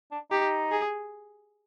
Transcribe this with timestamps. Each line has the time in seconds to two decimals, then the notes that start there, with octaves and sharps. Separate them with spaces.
0.11 D4
0.31 D#4 G4
0.71 G#4